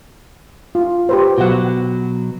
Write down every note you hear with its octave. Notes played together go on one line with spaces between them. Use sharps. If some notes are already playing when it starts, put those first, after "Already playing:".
F4
G4 B4 C5
B2 F#3 F#4 F#5